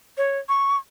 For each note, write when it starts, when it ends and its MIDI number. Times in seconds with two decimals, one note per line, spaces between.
0.18 0.39 73
0.49 0.77 85